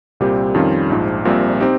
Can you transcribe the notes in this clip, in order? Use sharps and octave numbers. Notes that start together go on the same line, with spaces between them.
C2 A#2 G3 C4 G4
F2 D#3 G3 C#4 F4
A#1 G#2 F3
A#1 A#2 G3 C4
C4 D#4 G4